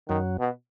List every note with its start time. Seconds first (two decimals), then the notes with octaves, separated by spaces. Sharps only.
0.09 F#2 D#3 F#3
0.40 B2